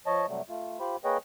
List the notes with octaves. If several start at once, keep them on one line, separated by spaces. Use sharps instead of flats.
F3 C#5 D#5 A5
C3 F#3 G3 A3
A3 F4
F4 G4 C5 B5
A#3 G#4 B4 C#5 D#5 G5